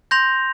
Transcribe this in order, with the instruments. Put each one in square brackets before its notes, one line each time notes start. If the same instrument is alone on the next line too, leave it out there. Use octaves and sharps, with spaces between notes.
[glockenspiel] C6 G6 A#6 F7